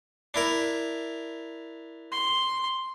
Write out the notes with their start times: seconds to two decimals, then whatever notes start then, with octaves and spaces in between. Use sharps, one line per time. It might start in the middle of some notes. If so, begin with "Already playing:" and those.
0.34 D4 E4 A#4
2.12 C6